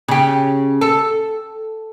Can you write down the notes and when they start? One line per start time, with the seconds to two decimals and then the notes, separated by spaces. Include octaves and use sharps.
0.08 C#3 G4
0.81 A4